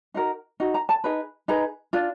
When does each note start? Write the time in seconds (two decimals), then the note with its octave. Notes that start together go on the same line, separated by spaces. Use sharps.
0.14 D#4 F#4 A#4
0.60 D#4 F#4
0.74 A#5
0.89 A5
1.04 D#4 G#4 B4
1.48 D#4 G#4 B4 A#5
1.93 D4 F4